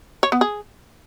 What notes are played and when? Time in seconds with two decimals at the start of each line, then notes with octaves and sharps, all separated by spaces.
0.23 C#5
0.32 B3
0.41 G#4